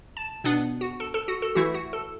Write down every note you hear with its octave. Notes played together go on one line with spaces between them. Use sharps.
A5
B2 B3 D4 F#5
F#4
A4
A4
F#4
A4
E3 A3 E4 F#4
F#4
A4